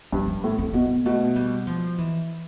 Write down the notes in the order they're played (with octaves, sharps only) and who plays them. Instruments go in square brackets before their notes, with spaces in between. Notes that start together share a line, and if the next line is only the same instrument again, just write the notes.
[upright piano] G2 [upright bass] F3
[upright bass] D4
[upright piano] A2
[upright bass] C4
[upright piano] B2 [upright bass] B3
[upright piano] B2 [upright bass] A3
[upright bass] G3
F3
E3